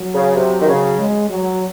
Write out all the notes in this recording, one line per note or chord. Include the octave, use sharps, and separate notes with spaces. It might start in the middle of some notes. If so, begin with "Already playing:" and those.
Already playing: F#3
C#3
C3
D#3
C#3
G#3
F#3